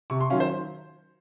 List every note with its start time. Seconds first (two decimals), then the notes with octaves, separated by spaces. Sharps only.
0.10 C3 C#6
0.21 C6
0.30 D#3 F#3 C#4 F5
0.40 C5